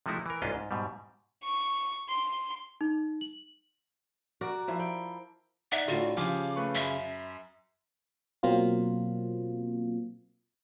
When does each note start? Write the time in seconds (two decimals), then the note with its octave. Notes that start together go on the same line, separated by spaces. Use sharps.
0.06 C3 F3 G#3 A3 D#4 E4
0.26 E3 A#4
0.42 C2 G#2 C#4 D4 F4 D#5
0.54 G#2
0.71 G#2 B2 G3
1.43 C#6
2.09 C6
2.81 D#4
3.21 F#7
4.41 F#4 A#4 D5
4.68 F3 E4
4.79 G5
5.72 D#4 D5 E5 F#5
5.88 A2 D3 F4 F#4
6.17 C#3 F3 G4 G#4 D6
6.56 A3 B4 C#6
6.75 F#2 E5 B5
8.43 B2 F#3 A#3 C4 F4